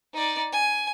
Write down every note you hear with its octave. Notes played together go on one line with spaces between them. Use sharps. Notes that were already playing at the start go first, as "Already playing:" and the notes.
D#4 D5
G#5